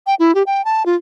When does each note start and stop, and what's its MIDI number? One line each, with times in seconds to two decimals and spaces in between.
0.07 0.15 79
0.19 0.34 64
0.35 0.43 67
0.46 0.64 79
0.65 0.85 81
0.86 0.96 65